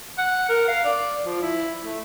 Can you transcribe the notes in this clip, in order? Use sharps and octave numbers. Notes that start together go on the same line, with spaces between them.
F#5
A#4
F5
D5
F3
E4
A3